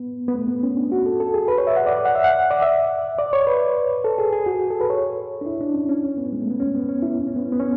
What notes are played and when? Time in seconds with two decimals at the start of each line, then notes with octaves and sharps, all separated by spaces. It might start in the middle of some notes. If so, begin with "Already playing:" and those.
Already playing: B3
0.28 B3
0.34 A3
0.48 B3
0.63 C#4
0.77 D4
0.92 F#4
1.06 A4
1.20 A4
1.34 G#4
1.48 B4
1.58 C#5
1.67 E5
1.76 F#5
1.86 D5
2.05 F#5
2.15 E5
2.24 F#5
2.50 D5
2.62 E5
3.19 D5
3.33 C#5
3.47 B4
4.04 A4
4.18 G#4
4.33 G#4
4.46 F#4
4.71 A4
4.81 B4
4.90 C#5
5.41 D4
5.46 E4
5.61 D4
5.74 C#4
5.89 C#4
6.04 C#4
6.17 B3
6.32 G#3
6.41 A3
6.50 B3
6.60 C#4
6.75 B3
6.89 C#4
7.03 E4
7.27 C#4
7.36 B3
7.45 C#4
7.52 B3
7.60 C#4